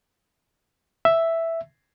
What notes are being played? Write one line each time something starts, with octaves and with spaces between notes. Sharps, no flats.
E5